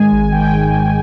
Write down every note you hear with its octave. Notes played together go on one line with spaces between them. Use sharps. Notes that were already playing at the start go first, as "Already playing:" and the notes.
Already playing: G#2 D#3 G#3 G#5
G#1
D#3 G5